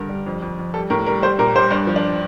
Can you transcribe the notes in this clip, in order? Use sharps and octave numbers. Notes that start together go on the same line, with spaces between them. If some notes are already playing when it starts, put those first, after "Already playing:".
Already playing: G2 D3 A#4
G3
F2
F2
F2
G3 A4
A2 A#4
G3 A#4
G3 C5
A#2 A#4
G3 C5
G2 D4
F3
D4